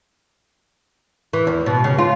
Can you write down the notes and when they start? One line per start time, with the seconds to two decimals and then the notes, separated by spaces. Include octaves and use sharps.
1.33 E3
1.47 E2
1.66 B2
1.84 C#3
1.98 F4